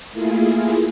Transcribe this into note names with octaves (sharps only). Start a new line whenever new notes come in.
A3 A#3 E4 F4 G#4